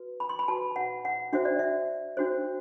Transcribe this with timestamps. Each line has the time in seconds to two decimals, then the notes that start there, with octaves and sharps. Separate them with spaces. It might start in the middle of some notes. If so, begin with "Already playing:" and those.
Already playing: F#4 B4
0.20 B5
0.29 C6
0.39 B5
0.48 F#4 B4 A5
0.76 F#5
1.05 F#5
1.33 D4 F#4 C5 E5
1.45 D5
1.59 E5
2.17 D4 F#4 C5